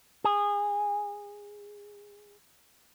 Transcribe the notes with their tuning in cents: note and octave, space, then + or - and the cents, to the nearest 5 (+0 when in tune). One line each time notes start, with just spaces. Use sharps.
G#4 -20